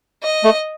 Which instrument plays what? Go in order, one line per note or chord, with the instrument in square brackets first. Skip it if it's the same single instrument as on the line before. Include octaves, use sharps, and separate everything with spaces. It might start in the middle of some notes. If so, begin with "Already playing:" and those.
[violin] D#5
[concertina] A3